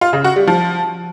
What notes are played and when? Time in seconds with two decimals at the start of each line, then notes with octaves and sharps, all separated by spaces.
0.01 F4
0.13 C#3
0.24 F#4
0.36 G3
0.47 F3